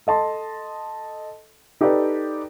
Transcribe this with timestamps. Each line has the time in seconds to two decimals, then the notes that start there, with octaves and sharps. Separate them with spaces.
0.07 A4 D#5 A5 C6
1.81 D#4 G4 A4 B4 D5